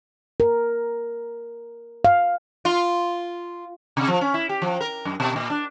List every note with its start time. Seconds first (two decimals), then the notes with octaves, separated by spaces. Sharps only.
0.40 A#4
2.05 F5
2.65 F4
3.97 C3
4.08 F3
4.21 C#4
4.34 E4
4.49 G4
4.62 F3
4.81 A#4
5.05 F#2
5.20 B2
5.36 A#2
5.50 D4